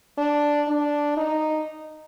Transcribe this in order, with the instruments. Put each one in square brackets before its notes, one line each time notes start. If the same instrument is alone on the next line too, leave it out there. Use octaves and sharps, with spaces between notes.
[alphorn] D4
D4
D#4